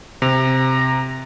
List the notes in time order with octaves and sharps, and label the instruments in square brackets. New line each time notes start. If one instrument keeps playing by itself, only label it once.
[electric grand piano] C3 [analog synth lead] A#5